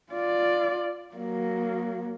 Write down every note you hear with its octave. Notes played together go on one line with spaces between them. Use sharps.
F4 D5
F#3 A#3